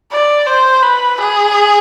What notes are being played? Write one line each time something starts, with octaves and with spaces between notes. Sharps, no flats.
D5
C5
B4
G#4